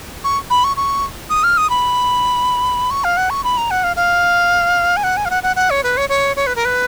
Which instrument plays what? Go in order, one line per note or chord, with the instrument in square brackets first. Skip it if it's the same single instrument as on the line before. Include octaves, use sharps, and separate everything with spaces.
[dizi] C#6
B5
C#6
C#6
D#6
F6
D#6
B5
C#6
F5
F#5
C#6
B5
A#5
F#5
F5
F5
G#5
F#5
G#5
F5
F#5
F#5
F#5
C#5
B4
C#5
C#5
C#5
B4
A#4
B4